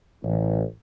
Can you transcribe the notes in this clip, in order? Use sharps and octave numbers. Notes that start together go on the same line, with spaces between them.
A1